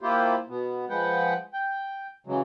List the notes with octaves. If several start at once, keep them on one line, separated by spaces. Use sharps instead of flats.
A#3 E4 F4 G4 C5
B2 B3
F3 G#3 B4 F#5 G5
G5
C#3 E3 F#3 G#3